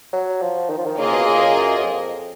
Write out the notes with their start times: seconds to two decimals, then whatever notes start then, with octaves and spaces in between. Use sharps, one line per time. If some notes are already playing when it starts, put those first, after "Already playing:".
0.13 F#3
0.42 F3
0.70 D#3
0.78 F3
0.86 D#3
0.98 C#3 A#3 F4 G#4 D#5 G#5
1.13 B2
1.26 C#3
1.37 B2
1.41 C#3
1.55 F#2
1.77 F#2
1.83 F2